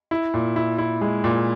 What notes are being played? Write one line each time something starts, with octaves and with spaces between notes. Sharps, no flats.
E4
A#2
E4
E4
G#3
A#2